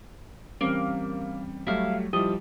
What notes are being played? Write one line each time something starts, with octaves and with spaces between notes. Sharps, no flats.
E3 G3 A#3 C4 C#4
F#3 G3 A3 E4 F5
F3 G3 E4 G4 D#5